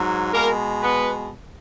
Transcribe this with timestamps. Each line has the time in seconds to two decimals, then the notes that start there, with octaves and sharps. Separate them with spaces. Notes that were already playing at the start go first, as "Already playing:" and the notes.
Already playing: G#2 F#3
0.33 B2 G#3 A#3 A#4
0.82 B3 B4